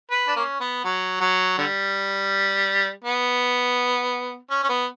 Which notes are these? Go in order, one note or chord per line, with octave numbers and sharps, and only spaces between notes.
B4
D4
A#3 C#4
B3
F#3
F#3
D3 G3
B3
C#4
C#4
B3